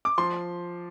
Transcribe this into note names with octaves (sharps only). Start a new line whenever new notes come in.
D6
F3 C6